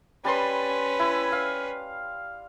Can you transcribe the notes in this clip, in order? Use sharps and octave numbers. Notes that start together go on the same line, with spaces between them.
G3 C#4 B4 A5 C6
E4
F5